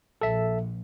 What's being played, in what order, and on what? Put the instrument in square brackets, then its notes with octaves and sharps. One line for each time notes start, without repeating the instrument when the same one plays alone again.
[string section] A#1 [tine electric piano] A4 E5